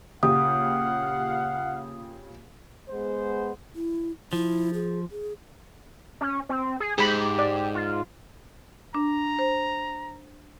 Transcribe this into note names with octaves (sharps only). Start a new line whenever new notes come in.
A#2 C#3 G4 F5 F#5 D#6
G#3 B3 C5
E4
F3 E4
G#4
G#4
C#4
C4
G#4
G#2 G4 G#4 B5
D5
F4
D4 A#5
C5